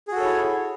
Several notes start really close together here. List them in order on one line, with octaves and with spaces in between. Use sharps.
G#4 F#4 A4 C#5 E4